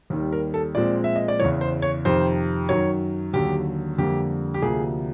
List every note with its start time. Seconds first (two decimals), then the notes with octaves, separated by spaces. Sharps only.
0.10 D#2 D#3 G3
0.33 A#4
0.54 A4
0.75 A#2 F3 G#3 C4 D5
1.04 E5
1.16 D#5
1.28 D5
1.40 E2 C#3 E3 C#5
1.61 C5
1.82 C#5
2.05 F2 C3 D#3 C5
2.69 F#2 D#3 F#3 C#5
3.33 D#2 D3 F#3 G4
3.98 F2 D3 G3 A#3 G4
4.54 G4
4.62 D2 C3 F3 A#3 G#4